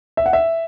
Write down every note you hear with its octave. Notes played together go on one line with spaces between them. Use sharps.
E5
F#5
E5